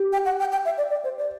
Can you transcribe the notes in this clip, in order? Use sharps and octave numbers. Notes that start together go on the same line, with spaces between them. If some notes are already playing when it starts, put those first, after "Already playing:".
Already playing: G4
G5
F#5
G5
G5
E5
D5
D5
C5
D5